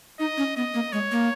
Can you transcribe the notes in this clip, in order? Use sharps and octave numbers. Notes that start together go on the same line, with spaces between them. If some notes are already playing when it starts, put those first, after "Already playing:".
D#4 D#5
C#4
B3 D#5
A#3
G#3 C#5
A#3